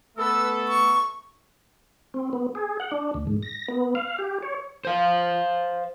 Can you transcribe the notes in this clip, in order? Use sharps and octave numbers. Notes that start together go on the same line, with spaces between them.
A3 B3 A4 B4 E6
C#6
C4
B3
G#4
F#5
D4
D2
G#2
A#6
B3
F5
G4
C#5
C5 F5